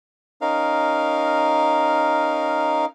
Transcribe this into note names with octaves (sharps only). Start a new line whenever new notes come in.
C#4 D#4 A#4 F5